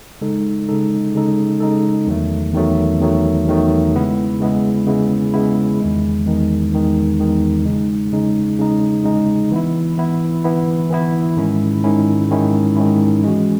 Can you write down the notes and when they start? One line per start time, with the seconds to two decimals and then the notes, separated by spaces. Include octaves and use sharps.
0.21 C#3 G#3 D#4 A4
0.69 C#3 G#3 D#4 A4
1.15 C#3 G#3 D#4 A4
1.60 C#3 G#3 D#4 A4
2.07 E2 D#3 F#3 A3
2.53 E2 D#3 F#3 A3
3.00 E2 D#3 F#3 A3
3.48 E2 D#3 F#3 A3
3.94 C#3 G#3 B3 E4
4.40 C#3 G#3 B3 E4
4.87 C#3 G#3 B3 E4
5.34 C#3 G#3 B3 E4
5.80 E2 D#3 G#3
6.26 E2 D#3 G#3
6.72 E2 D#3 G#3
7.19 E2 D#3 G#3
7.65 C#3 G#3 D#4
8.12 C#3 G#3 D#4
8.58 C#3 G#3 D#4
9.04 C#3 G#3 D#4
9.51 E3 B3 E4
9.98 E3 B3 E4
10.44 E3 B3 E4
10.90 E3 B3 E4
11.37 G#2 D#3 G#3 C#4 E4
11.84 G#2 D#3 G#3 C#4 E4
12.30 G#2 D#3 G#3 C#4 E4
12.77 G#2 D#3 G#3 C#4 E4
13.23 E3 G#3 C#4 F#4